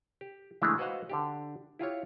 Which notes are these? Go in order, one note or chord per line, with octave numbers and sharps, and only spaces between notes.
G4
C#3 E3 G#3 A3 D4 E4
F#4 B4 C5 D#5 F5 F#5
D3 D4 G4
E4 F4 G4 C#5